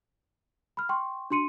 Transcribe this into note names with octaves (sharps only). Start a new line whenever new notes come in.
B5 F6
G5 C6 C#6
D4 F#4 C6 C#7 D#7